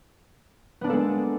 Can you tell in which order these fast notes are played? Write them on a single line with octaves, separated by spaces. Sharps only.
B3 D4 A#3 A4 G#3